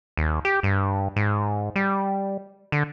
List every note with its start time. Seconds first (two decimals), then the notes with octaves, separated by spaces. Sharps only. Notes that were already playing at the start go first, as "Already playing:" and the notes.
0.17 D#2
0.45 G4
0.63 G2
1.16 G#2
1.76 G3
2.72 D3